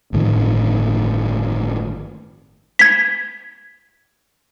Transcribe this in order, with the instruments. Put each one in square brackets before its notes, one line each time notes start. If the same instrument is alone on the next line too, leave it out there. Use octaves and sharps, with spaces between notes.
[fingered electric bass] G1 A2 D#3 F3
[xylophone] G#6 B6